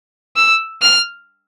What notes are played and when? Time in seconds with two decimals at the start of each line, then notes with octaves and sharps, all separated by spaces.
0.36 E6
0.82 F6